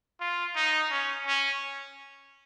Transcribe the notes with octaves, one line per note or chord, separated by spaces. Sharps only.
F4
D#4
C#4
C#4